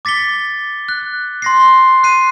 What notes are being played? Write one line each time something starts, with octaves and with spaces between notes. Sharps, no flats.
D6 A6 B6 C#7 G7
F#6
C6 A#6 C7
F#6 C7 D#7